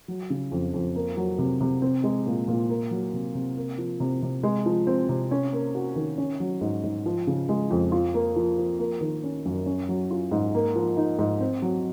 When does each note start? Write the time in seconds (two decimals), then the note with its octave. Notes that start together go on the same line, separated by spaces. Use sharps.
0.08 F#3
0.30 C#3
0.52 F2
0.74 F2
0.96 A#3
1.17 F#3
1.39 C3
1.61 C3
1.82 C4
2.04 G#3
2.26 A#2
2.48 A#2
2.69 A#3
2.91 F#3
3.14 C3
3.35 C3
3.57 A#3
3.78 F3
4.00 C3
4.22 C3
4.43 G#3
4.66 F3
4.87 C4
5.09 C3
5.31 C#4
5.53 A#3
5.75 F#4
5.96 D#3
6.18 C#4
6.40 F#3
6.61 G#2
6.84 G#2
7.06 F3
7.27 C#3
7.49 G#3
7.70 F2
7.92 F4
8.14 A#3
8.36 F3
8.58 F3
8.79 A#3
9.01 D#3
9.24 C#4
9.46 F#2
9.66 C#4
9.89 F#3
10.11 F4
10.31 G#2
10.54 A#3
10.76 F3
10.97 D#4
11.19 G#2
11.40 C4
11.62 F#3